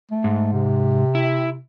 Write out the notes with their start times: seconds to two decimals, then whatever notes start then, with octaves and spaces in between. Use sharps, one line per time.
0.11 A3
0.24 G#2
0.53 C3
1.15 E4